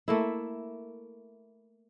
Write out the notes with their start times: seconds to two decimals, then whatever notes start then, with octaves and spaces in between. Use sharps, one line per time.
0.08 A3 A#3 E4